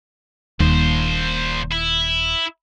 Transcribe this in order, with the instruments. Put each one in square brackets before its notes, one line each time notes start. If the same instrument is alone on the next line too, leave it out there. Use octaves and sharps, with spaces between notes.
[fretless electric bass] D#1 D#2 [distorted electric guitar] A#2 C5
[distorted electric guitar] E4